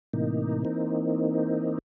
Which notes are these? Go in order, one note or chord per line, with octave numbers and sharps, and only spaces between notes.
A2 C3 E3 A#3 D#4
E3 A#3 C4 D#4